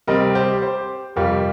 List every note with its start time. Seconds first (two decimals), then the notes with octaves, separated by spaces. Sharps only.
0.07 C3 G3 C4 A#4 D#5
0.35 G4 C5
0.62 G4 C5
1.16 F2 C3 G3 F4 A#4